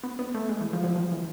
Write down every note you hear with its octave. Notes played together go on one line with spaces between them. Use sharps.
B3
B3
A3
G#3
E3
F3
F3
F3
E3